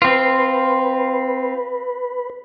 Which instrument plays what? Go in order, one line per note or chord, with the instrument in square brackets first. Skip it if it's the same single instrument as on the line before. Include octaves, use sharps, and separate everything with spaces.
[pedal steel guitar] C4 F4 [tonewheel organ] B4